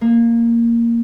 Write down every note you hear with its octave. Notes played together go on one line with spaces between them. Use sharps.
A#3